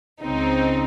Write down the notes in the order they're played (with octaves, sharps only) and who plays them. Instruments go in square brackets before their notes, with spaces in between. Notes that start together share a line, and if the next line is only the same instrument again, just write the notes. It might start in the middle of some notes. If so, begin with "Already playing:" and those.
[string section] C#2 C#3 C4 D#4